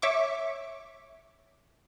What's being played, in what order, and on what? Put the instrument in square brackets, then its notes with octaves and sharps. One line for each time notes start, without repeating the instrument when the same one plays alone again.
[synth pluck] C#5 E5 C#6 D6